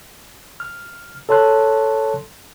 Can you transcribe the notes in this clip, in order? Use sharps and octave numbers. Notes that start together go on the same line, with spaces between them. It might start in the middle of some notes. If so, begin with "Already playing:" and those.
F6
A4 C#5 A5 C6 F#6